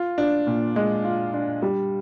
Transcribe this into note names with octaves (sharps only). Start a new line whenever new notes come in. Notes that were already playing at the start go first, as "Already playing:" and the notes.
Already playing: F4
D4
A#2
G#3
F4
D4
G3